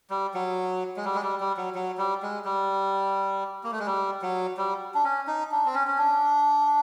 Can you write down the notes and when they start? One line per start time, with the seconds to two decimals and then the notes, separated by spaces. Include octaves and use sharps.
0.10 G3
0.34 F#3
0.97 G#3
1.05 G3
1.15 G#3
1.23 G3
1.40 G3
1.57 F#3
1.75 F#3
1.98 G3
2.23 G#3
2.45 G3
3.64 A#3
3.72 A3
3.80 G#3
3.86 G3
4.22 F#3
4.57 G3
4.94 D4
5.05 C#4
5.27 D#4
5.52 D4
5.66 C4
5.74 C#4
5.87 C#4
5.98 D4